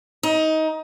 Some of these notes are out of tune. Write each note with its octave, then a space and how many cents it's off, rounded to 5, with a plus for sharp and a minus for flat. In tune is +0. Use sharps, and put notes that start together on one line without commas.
D#4 +20